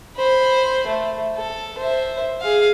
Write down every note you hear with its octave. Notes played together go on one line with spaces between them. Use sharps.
C5 B5
A3
A4
C5 E5
G#4 F5